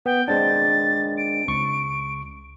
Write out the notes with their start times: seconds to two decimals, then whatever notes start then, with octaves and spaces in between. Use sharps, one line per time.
0.06 B3 G5
0.28 G#3 C4 D4 A6
1.18 D7
1.48 C#2 C#6